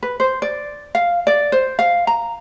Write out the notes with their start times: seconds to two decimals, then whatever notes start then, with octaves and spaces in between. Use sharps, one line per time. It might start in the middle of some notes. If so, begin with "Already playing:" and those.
0.03 B4
0.20 C5
0.42 D5
0.95 F5
1.27 D5
1.52 C5
1.79 F5
2.07 A#5